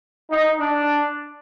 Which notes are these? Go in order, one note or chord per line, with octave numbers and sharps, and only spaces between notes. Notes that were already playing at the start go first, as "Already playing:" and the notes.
D#4
D4